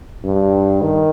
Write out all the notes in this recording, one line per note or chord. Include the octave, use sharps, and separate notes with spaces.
G2
D#3